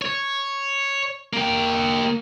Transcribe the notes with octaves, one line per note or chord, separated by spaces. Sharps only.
C#5
A#3 G5